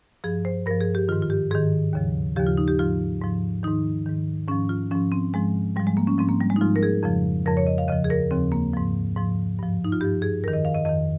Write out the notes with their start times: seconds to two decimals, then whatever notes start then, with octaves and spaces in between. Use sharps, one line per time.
0.24 G2 F3 G#4
0.45 C5
0.66 G2 A#4
0.71 F3
0.81 G#4
0.95 G4
1.08 D#3 F4
1.12 G#2
1.22 F4
1.30 G4
1.51 G#2 D#3 G#4
1.93 D#2 C#3 F3
2.36 D#2 C#3 F3 G4
2.47 F4
2.57 D#4
2.68 G4
2.79 G#2 F3 F4
3.21 G#2 F3
3.63 G#2 D#3 D#4
4.06 G#2 D#3
4.48 G#2 C#4
4.51 F3
4.69 F4
4.91 G#2 F3 C#4
5.12 C4
5.34 G#2 F3 G#3
5.76 G#2 G3
5.80 F3
5.87 G#3
5.97 A#3
6.07 C#4
6.18 G#2 F3 C4
6.29 A#3
6.40 G3
6.50 G#3
6.56 D#4
6.61 G#2 F3 F4
6.76 A#4
6.83 G#4
7.03 F2 C#3 F3
7.46 F2 C#3 F3 A#4
7.57 C#5
7.67 D#5
7.78 F5
7.88 D#2 C#3 F3 D#5
8.04 G#4
8.10 A#4
8.31 D#2 C#3 F3 C4
8.52 A#3
8.73 G#2 F3
9.16 G#2 F3
9.59 G2 F3
9.84 D#4
9.92 F4
10.01 G2 F3 G4
10.22 G#4
10.44 F2 D#3 A#4
10.53 D#5
10.65 F5
10.74 D#5
10.85 F2 D#3 D#5